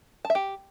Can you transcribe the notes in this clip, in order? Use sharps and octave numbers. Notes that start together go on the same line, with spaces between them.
A5
E5
G4